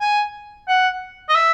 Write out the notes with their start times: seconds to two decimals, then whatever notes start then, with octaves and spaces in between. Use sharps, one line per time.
0.01 G#5
0.68 F#5
1.29 D#5
1.35 E5